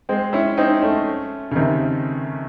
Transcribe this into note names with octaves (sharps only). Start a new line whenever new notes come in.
G#3 C4
C#4 E4
C4 D#4
A3 C#4
C#3
C3 D#3